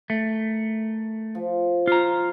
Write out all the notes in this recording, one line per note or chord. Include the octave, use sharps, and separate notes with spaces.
A3 A#4
F3
F4 A#5